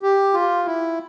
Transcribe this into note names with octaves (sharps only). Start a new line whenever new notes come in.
G4
F4
E4